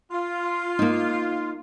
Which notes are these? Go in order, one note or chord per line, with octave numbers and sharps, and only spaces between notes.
F4
A#3 D#4